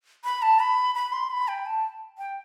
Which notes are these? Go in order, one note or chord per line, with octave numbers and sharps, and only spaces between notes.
B5
A5
B5
B5
C6
B5
G5
A5
G5